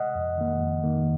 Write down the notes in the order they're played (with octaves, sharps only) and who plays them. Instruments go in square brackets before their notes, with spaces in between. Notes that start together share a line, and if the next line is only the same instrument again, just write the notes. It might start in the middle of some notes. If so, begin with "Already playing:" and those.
Already playing: [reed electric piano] D#5 F#5
F2
D#3 A#3
F2
D#3 A#3